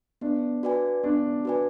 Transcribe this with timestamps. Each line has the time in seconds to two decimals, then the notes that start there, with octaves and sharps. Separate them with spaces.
0.21 B3 D4
0.63 F#4 B4 D5 G#5
1.03 B3 D4
1.45 F#4 B4 D5 G#5